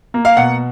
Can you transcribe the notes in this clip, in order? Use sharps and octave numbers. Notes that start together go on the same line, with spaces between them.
A#3
F5
B2 F#5